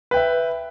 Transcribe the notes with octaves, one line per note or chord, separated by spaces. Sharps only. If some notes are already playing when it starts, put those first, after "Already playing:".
B4 E5 G5